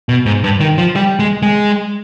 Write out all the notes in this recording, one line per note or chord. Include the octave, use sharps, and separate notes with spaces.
B2
G#2
G2
D#3
F3
G3
G#3
G#3